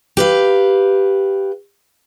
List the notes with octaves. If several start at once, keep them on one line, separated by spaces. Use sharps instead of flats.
G4 B4 F5